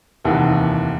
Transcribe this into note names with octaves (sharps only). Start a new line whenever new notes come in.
F1 D#2 E3 F#5